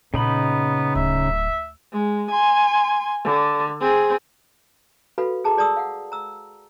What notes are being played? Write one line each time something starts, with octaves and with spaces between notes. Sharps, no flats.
A#2 C#3 B3 D#4 B5
D1 E5
G#3
G#5 C6
D3
C4 G#4
F#4 A4 B4 F5 B5
G#4 A4 A5 A#5 D6
G#4 D5 A5 D#6 E6
F5 F#5
A#5 E6